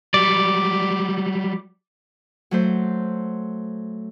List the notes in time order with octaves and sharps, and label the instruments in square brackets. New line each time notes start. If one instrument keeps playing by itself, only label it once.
[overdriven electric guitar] F#3 G3 [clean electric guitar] D5
[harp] F#3 A3 C5